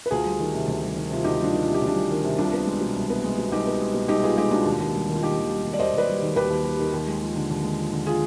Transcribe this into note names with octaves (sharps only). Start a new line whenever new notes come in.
B4
D2 F4 G#4
G3
D#3
C3
D2
G3
D#3
C3 F4
D2 D#4 G4
G3 D4 F4
D#3
F4
C3
G4
D2
D4 F4
G3
D#3
C3
C2 D4 F4
B3
G#3
B2
C2
B3
G#3
B2
C2 D#4 G4
B3
G#3
B2
C2 D#4 G4
B3 F4 G#4
G#3 D#4 G4
B2 D4 F4
D#2
D#2
G3
D#3
F4
D#2 D#4 G4
D#2
G3
D#3
D5
D#2 C5 D#5
D#2 B4 D5
G3
D#3
D#2 G4 B4
D#2
G3
D#3
D#2
G#3
F3
D3
D#2
G#3
F3
D3
F4 G#4